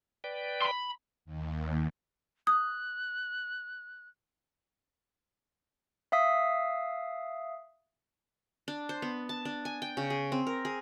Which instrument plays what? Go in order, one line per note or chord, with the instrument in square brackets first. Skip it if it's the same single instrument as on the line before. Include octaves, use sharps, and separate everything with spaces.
[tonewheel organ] B4 D5 G5
[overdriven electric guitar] B5 C6
[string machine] D#2
[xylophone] D#6 [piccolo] F#6
[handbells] E5 F5 D#6 B6
[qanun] D4
C5
B3
A5
D4
G#5
G5
C#3
G#4
C4
A#4
G#4